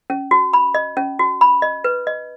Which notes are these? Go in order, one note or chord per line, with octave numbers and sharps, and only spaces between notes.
C#4
F#4
B5
D#5
C#4
F#4
B5
D#5
B4
D#5